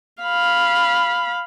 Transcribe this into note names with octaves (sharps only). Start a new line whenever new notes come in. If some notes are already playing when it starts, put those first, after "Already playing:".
F5 B5